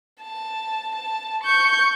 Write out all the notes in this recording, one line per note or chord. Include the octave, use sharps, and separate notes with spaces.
A5
A5
C#6 G6